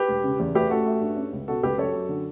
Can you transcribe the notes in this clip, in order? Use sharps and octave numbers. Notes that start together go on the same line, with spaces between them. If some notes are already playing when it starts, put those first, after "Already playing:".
Already playing: G4 B4
E1
C#3
E2
A3 G4 B4
A1 F#4 A4
A3
G2
C#4
C#2
B2 F#4 A4
C#2 G4 B4
F#2 A4 C#5
F#2
D3